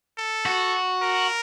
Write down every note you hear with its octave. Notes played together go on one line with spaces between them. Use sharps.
A4
F#4
A#4